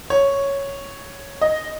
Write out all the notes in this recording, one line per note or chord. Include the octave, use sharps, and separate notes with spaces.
C#5
D#5